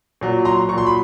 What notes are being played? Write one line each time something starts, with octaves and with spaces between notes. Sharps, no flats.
A#2 F#3
A#5 C6
A#2 F#3 C6 C#6
B5